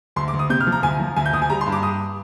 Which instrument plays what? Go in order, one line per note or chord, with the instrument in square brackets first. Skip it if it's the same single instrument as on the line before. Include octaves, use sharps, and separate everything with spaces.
[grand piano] D2 C6
D6
D2
D#6
C3 G6
F6
F3
A#5
D2 G#5
F3
D2 G#5
G6
D2 D#6
G#5
G3 A#5
C6
G2
D6
G2 D#6